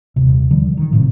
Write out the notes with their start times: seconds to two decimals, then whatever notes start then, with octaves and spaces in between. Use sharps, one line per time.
0.16 D#1 C3
0.51 D3 F3 G3
0.77 D#3
0.91 F#1 A2 C3